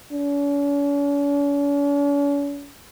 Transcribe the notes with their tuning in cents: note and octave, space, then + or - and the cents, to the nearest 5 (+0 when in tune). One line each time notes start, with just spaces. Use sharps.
C#4 +45